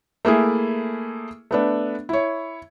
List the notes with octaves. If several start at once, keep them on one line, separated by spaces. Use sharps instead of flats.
A3 A#3 E4 G#4
A3 B3 D4
E4 C#5